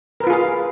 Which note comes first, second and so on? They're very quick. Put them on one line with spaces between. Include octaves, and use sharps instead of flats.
A#4 B4 F4 G#4 F5